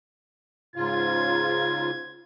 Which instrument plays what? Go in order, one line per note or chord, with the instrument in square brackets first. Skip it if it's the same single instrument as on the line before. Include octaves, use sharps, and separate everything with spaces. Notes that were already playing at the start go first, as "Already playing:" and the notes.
[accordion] G#2 C#3 F4 [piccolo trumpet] G#6